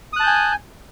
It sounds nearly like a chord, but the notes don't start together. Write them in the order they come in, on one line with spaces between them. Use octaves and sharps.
D#6 F#6 A5 G6 G#5